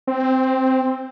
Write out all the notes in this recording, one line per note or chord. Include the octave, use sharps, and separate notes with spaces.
C4